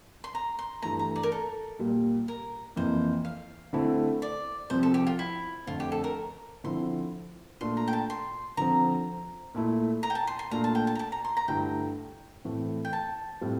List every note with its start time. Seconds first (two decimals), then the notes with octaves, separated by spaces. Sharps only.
0.24 C6
0.35 A#5
0.59 C6
0.82 G2 E3 A3 A#5
0.99 A#5
1.16 D5
1.23 A#4
1.32 A4
1.79 A#2 G3 A#3
2.28 A#4
2.76 F2 E3 A#3 C5
3.25 F5
3.73 D3 A3 C4 E4
4.22 D5
4.70 C2 C3 F3 C4 C5
4.83 A4
4.94 G4
5.07 F4
5.19 E4
5.66 F2 D3 A3 C4 F4
5.80 G4
5.92 A4
6.04 A#4
6.64 D3 F3 C4 E4 C6
7.61 A#2 A3 D4 F4 C6
7.77 A#5
7.88 G5
7.93 A5
8.10 C6
8.57 D3 F3 C4 A#5
9.55 A#2 A3 E4
10.03 A#5
10.10 G5
10.15 A5
10.27 C6
10.39 C6
10.51 A#2 A3 D4 F4 A#5
10.64 A5
10.75 G5
10.87 A5
10.95 A#5
10.99 A5
11.12 A#5
11.24 C6
11.37 A#5
11.48 G2 D3 A3 E4 G5
12.44 A2 E3 A3 C4
12.85 G5
12.93 A5
13.41 A2 G3 C4 F4